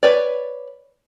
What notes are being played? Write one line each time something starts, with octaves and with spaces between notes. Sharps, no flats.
B4 C#5 D5